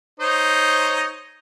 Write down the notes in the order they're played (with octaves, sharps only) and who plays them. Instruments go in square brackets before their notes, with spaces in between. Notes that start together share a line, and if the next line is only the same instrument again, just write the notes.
[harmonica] D#4 C5 C#5